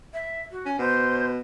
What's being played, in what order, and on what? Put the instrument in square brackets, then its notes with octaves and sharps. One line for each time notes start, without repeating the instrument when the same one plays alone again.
[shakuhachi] E5
F#4
[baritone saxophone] C#4
[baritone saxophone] B2 [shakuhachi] C5